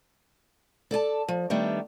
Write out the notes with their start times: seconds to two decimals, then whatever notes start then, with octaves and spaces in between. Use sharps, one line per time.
0.91 A4 D5 G#5 A5
1.28 F3
1.50 D#3 G3 A3 B3 D4